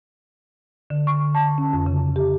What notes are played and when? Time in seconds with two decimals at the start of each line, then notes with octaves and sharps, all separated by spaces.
0.90 D3
1.07 C#6
1.35 A5
1.58 C#4
1.73 F2
1.86 C#3
2.16 G4